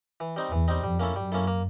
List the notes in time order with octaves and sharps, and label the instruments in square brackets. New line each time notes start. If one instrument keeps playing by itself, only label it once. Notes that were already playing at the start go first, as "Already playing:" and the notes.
[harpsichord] E3
G3 C4 D#4
[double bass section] E2 [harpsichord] E3
[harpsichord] G3 C4 D#4
[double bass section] F2 [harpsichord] G3
[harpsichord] A#3 C#4 E4 A4
[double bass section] F#2 [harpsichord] G3
[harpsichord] A#3 C#4 E4 A4
A#3